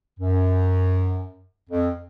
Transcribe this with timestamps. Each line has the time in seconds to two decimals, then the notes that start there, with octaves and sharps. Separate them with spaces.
0.20 F#2
1.70 F2